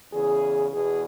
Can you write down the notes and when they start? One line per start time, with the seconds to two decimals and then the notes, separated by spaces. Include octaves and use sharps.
0.13 E2 C#3 E3 G#4
0.71 E2 B2 G#4